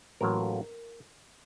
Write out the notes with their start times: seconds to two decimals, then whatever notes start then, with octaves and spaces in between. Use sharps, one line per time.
0.21 A1 A2 F#3 A#3 F4 A#4